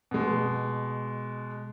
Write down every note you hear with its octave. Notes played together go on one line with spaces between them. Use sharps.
B2 G#3